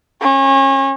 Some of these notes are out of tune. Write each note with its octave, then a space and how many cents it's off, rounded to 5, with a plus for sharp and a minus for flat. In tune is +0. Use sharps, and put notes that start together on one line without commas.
C#4 -30